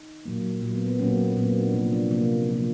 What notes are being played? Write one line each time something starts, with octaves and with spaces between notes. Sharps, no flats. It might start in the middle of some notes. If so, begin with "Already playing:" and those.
Already playing: D#4
A#2 F#3 A#3
A#2 F#3 A#3
B3
B3
A#2 F#3 A#3 C#4
C4
A#2 F#3 A#3 B3
C4
D4
C3 F3 A#3
D4
C3 F3 A#3
C3 F3 A#3